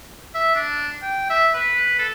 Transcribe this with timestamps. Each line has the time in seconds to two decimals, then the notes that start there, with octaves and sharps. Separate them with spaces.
0.34 E5
0.55 D4
1.02 G5
1.30 E5
1.54 B4
1.99 A4